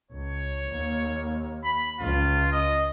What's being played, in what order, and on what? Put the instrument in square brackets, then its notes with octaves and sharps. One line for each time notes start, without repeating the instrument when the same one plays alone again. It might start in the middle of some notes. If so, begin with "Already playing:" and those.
[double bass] C#2 [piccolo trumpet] C#5
[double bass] D#2 A#3
[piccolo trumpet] B5
[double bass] C#2 [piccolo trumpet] F4
[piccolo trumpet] D#5